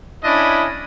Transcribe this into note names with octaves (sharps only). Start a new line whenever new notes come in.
C#4 D4 E4 D#5 B5